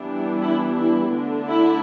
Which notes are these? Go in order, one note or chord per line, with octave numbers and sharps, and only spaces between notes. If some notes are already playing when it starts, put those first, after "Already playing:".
Already playing: E3 G3 B3 D4
E4
E4
D3 A3 D4
E4